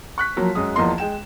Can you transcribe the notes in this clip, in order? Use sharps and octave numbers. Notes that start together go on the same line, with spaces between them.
C#6 F#6 B6
F3 F#3 A#3
F#2 G#3 D#6
E2 F3 A#3 D#5 C6
G#3 G5 E7